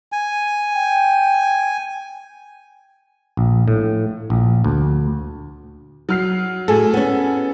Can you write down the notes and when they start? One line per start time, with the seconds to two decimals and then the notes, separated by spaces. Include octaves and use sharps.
0.12 G#5
0.73 G5
3.37 A#1
3.68 A2
4.30 A#1
4.64 D2
6.09 F#3 F6 C7
6.68 A2 F#4 G#4 A4
6.94 B3 C#4